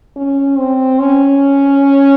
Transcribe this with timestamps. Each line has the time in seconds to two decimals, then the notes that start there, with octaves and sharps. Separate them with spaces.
0.16 C#4
0.58 C4
0.99 C#4